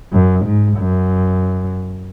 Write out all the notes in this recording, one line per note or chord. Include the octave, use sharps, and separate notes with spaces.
F#2
G#2
F#2